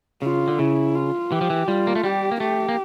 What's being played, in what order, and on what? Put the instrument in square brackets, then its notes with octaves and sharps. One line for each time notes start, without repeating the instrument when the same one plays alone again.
[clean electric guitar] C#3 [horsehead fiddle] F4
[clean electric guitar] D3
[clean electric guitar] C#3 [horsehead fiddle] E4
[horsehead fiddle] F4
[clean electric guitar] E3 [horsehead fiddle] G4
[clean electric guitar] F3
E3
[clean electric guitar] G3 [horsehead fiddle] F4
[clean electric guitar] A#3
A3
[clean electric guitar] G3 [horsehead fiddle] G4
[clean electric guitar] A#3
[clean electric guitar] A3 [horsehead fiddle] G4
[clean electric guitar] A#3